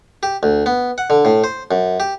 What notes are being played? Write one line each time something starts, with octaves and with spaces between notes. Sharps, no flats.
G4
D2
B3
F#5
D3
A2
C5
F#2
G4